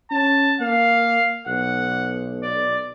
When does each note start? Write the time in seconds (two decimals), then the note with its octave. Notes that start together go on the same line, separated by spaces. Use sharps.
0.11 C#4 A5
0.61 A#3 F5
1.47 B1 F#5
2.43 D5